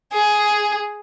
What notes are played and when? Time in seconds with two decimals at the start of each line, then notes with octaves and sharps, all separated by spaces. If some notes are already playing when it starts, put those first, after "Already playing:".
0.12 G#4